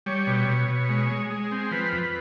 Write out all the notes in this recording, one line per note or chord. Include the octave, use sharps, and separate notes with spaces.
G3 C#5
B2
B2
B2
G#3
G#3
G#3
C4
F3 B4
F2